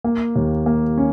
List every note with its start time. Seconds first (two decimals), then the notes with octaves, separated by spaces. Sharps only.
0.04 A#3
0.36 D#2
0.66 A#3
0.98 C#4